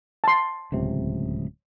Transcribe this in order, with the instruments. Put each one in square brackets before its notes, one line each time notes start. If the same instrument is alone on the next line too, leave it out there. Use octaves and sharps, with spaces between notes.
[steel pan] A5 C6
[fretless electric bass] D1 C#2 C3